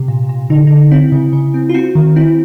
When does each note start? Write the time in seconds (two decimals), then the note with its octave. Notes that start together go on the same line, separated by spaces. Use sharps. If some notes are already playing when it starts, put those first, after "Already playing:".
Already playing: C3 G4
0.08 A#2
0.29 A#2
0.50 D3 D#4
0.67 D3 D#4
0.91 C4 E4
1.12 C#3
1.33 C#3
1.54 C4
1.69 F4
1.74 C4 F#4
1.95 D#3
2.16 C4 E4